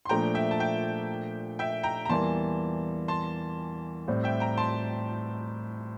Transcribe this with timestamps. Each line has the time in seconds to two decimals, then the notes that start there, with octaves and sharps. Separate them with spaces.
0.05 C6
0.09 A#2 F3 A3 D4 G5 A#5
0.35 E5 G5
0.51 A5
0.60 E5 G5
1.59 E5 G5
1.83 G5 A#5
2.05 A#5
2.09 E2 E3 G3 A#3 A5 C6
3.08 A5 C6
4.08 A2 G3 C4
4.24 E5 G5
4.40 G5 A#5
4.58 A5 C6